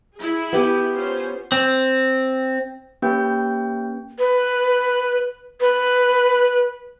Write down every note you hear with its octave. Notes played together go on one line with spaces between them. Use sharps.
E4 G#4
B3 G4
C#4 F4 C5
C4
A#3 C#4 G4 B4 G5 G6
B4
B4